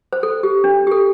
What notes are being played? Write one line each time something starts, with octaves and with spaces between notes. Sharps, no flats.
C5
A4
G4
D4
G4
A4